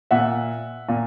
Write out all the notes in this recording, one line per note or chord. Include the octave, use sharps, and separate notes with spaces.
A#2 E5 F#5
A#2